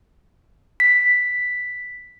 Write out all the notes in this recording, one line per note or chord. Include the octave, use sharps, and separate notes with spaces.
B6